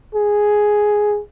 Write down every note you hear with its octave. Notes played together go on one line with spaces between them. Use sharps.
G#4